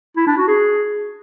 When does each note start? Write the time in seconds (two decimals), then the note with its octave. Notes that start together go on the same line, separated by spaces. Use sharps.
0.16 E4
0.27 D4
0.37 F#4
0.48 G#4